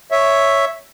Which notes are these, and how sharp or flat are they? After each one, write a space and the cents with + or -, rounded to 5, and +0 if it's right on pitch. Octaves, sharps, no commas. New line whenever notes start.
C#5 +0 E5 +0